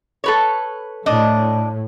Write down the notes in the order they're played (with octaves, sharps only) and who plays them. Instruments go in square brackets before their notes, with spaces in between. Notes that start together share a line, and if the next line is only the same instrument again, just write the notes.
[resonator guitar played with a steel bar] A4 B4 C#5
[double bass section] A2 [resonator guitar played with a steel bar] D4 D#5